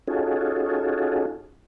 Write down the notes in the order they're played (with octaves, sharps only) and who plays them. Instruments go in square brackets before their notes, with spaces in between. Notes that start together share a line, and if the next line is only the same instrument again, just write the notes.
[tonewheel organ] C#4 D#4 F4 F#4 G#4 A4